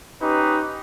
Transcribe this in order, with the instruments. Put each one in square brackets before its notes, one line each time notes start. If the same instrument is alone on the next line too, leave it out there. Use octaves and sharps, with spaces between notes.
[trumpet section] C#4 D#4 G4 B4